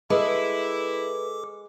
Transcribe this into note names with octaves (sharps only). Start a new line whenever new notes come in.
G#3 E4 A4 B4 D6